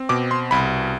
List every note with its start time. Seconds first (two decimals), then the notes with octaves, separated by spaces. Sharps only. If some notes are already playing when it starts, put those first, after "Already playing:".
Already playing: C4
0.09 B2 D6
0.31 C6
0.51 C2 B5